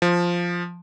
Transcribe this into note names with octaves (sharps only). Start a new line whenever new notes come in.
F3